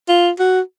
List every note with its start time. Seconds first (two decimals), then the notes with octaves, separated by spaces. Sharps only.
0.08 F4
0.39 F#4